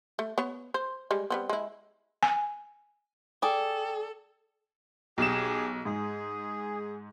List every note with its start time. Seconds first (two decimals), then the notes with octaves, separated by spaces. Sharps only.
0.19 A3
0.38 B3 C#5
0.74 C5
1.11 G3 G#3
1.30 G3 B3 C4
1.49 G#3 E4
2.23 G#5
3.42 G#4 A4 D5 G5
5.18 B1 G4 G#4 E7
5.85 G#2 G#4